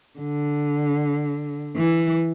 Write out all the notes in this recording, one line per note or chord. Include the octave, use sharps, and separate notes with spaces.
D3
E3